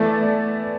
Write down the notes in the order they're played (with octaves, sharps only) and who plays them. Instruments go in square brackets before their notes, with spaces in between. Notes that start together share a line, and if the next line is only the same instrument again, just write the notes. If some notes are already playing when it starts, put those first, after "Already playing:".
Already playing: [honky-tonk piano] E3 B3 E4 A4 D5 [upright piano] A3